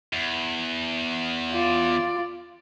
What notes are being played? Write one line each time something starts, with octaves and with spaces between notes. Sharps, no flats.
E2
F4 D5